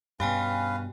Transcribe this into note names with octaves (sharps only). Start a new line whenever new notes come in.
G2 B2 C#4 G4 B4 F5 G5 G#5